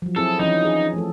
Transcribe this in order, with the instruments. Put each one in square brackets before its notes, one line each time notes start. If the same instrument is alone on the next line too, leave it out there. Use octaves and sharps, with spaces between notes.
[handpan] F3 F#3
[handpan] C4 E4 G#4 [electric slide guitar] A4
[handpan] E3 F3 C#4 [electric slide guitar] D#4
[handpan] F4 G#4
F3 A3 A4